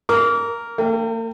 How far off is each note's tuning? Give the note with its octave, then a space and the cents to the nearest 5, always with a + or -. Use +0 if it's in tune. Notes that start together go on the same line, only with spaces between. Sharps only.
A#4 -5 D6 -35
A#3 -45 G5 +0